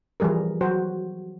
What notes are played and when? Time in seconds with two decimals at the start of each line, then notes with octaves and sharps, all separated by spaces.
0.20 E3 F3 G3 G#4 A#4
0.61 F#3 F#4 C5